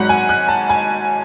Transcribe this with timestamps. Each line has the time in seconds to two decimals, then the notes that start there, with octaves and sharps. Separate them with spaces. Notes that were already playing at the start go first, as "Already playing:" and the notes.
Already playing: G#1 G#2 F#3 F#5
0.09 G#5
0.29 F#6
0.48 A5
0.70 G#5